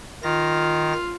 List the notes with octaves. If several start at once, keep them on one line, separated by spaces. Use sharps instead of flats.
D#3 F4 A#6